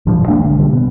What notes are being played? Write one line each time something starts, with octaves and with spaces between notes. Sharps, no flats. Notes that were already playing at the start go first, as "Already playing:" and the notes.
G2 A#2 E3 F3
D#1 G#3 A#3 D4
B1 D3
D3 G3
B2